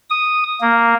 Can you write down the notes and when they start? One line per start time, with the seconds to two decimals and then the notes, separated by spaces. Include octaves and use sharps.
0.10 D#6
0.61 A#3